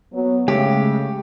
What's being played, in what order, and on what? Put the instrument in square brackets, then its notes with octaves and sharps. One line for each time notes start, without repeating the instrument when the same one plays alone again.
[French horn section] F#3 B3
[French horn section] C#3 [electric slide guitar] G#3 A3 [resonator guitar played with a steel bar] G4